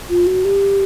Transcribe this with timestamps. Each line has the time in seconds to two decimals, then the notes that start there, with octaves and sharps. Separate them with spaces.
0.09 F4
0.27 F#4
0.45 G4